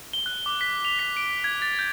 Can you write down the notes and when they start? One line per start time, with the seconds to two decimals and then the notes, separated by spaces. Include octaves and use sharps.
0.13 G7
0.26 F#6
0.46 D6
0.61 B6
0.85 F7
0.99 B6
1.17 D7
1.44 G#6
1.62 A6
1.79 G6